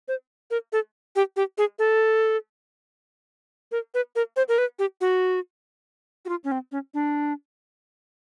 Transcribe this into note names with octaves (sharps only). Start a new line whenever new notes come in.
C5
A#4
A4
G4
G4
G#4
A4
A#4
B4
A#4
C5
A#4
B4
G4
F#4
F#4
F4
C#4
C4
C#4
D4